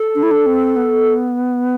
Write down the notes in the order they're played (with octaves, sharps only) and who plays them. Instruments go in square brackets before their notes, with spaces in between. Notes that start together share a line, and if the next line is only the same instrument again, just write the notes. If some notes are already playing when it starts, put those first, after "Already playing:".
Already playing: [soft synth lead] A4
[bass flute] D4
E4
D4
C4
B3